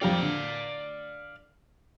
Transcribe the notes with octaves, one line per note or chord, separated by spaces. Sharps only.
F2 G4 D5 F5
D3